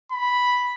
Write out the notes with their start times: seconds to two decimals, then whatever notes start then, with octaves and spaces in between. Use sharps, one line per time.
0.12 B5